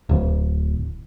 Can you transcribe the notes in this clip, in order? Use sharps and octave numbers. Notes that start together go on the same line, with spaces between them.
D1